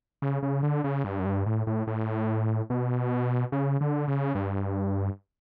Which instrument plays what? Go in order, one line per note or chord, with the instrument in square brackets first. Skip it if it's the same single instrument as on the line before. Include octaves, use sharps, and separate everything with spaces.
[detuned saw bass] C#3
C#3
D3
C#3
G2
F#2
G2
A2
A2
A2
B2
C#3
D3
C#3
G2